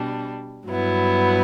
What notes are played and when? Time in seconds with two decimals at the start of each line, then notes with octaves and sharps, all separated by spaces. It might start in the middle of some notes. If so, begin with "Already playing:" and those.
Already playing: B2 G3 D4
0.67 G2 F#3 B3 E4